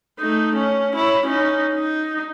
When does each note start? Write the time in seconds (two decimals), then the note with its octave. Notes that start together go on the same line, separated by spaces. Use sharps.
0.20 A3 D#4
0.56 C#4
0.96 E4 C#5
1.27 C#4 D#4
1.74 D#4